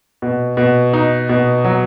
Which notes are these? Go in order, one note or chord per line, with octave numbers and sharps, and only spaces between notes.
B2
B2
D#4
B2
F#3